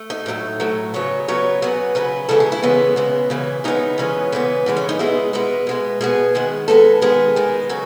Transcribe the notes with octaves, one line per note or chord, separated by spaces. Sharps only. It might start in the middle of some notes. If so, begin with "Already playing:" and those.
Already playing: A3
D#4
A2 F#3 A3
A2 F#3 A3
C#3 F#3 B3 C#5
C#3 F#3 B3 C#5
C#3 F#3 B3
C#3 F#3 B3 B4
C#3 E3 G#3 B3 A4
G#4
E4
C#3 E3 G#3 B3 C#4
C#3 E3 G#3 B3
C#3 E3 G#3 B3
C#3 E3 G#3 B3 D#4
C#3 E3 G#3 B3 C#4
C#3 E3 G#3 B3
C#3 E3 G#3 B3
C#4
D#4
B2 G#3 B3 E4
B2 G#3 B3 E4
B2 G#3 B3
B2 G#3 B3 G#4
D#3 G#3 B3
D#3 G#3 B3 A4
D#3 G#3 B3 G#4
D#3 G#3 B3
C#3 F#3 F#4